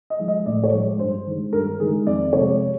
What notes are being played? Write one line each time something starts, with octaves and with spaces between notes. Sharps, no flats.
D#5
F3 G#3
D#5
A2 D5
C#5
F3 G#3
G2 C5
D#3 G#3
G2 A#4
D#3 G#3 G#4
F2 D5
C3 F3 G#3 C#5